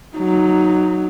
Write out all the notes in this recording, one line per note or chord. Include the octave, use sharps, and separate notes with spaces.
F#3 D#4